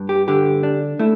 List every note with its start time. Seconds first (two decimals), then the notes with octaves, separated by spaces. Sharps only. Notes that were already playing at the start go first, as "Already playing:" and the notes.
Already playing: G2
0.09 G4
0.28 D3 G4
0.63 D4
0.99 A3 E4